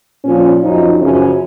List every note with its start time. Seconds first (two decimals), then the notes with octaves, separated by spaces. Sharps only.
0.24 A#2 F3 C#4
0.62 F#2 F3 D#4
1.01 F#2 C#3 F3 C#4